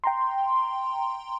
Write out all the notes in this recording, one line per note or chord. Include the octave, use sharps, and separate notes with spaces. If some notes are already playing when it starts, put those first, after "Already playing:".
G5 A#5 C6